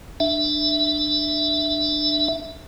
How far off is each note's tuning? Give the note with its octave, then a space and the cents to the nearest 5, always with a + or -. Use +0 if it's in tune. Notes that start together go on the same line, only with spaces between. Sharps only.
D4 +20 E5 -5